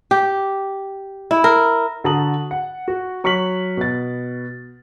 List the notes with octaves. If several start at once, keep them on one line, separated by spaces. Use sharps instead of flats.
G4
E4
A#4
D3 F#4 A5 A#5 D#6 F#7
F#5
F#4
F#3 C#6 F6 B6 F#7
B2 A6